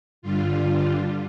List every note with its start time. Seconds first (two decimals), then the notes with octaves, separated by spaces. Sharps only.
0.22 G2 D3 G3 F4